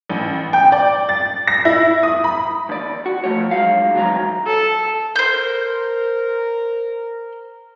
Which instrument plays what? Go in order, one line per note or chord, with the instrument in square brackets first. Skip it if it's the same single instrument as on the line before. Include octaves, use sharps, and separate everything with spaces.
[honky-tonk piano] A1
G5
D5
A6
A#6
E4
D#6
B5
[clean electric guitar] D#2 D5
F#4
F3 A3 C#5
F#3 G#3 F5
C2 D#3 E3 F#3 C#5 A#5
[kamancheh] A4
[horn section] A#4 [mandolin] C5 G6